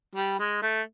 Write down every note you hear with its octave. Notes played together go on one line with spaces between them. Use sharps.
G3
G#3
A3